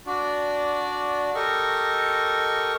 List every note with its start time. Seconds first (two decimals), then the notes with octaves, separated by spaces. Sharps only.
0.06 D4 F#4 D5
1.35 G4 A4 A#4 D#5 C#6